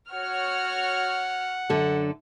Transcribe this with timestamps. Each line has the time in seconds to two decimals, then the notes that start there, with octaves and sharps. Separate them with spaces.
0.11 F#4 C#5 F#5 F6
1.70 F#2 D3 A4